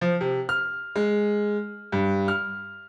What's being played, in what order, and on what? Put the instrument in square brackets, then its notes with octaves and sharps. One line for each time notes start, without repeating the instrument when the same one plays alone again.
[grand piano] F3
C3
F6
G#3
G2
F6